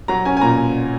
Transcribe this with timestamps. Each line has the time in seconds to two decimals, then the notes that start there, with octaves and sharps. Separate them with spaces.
0.08 F#3 A#5
0.25 C#4 G#5
0.37 G#5
0.41 A#2 A#5